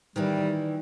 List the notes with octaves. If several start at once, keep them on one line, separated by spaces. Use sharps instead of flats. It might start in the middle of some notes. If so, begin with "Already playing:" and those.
D#3 E3 G3 E4